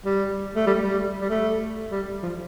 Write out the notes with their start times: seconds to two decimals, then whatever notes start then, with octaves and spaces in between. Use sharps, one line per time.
0.05 G3
0.55 A3
0.66 G3
0.83 G3
1.21 G3
1.29 A3
1.91 G3
2.23 F3